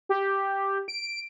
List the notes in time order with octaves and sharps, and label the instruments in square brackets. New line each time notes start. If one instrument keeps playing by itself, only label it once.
[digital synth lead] G4
D7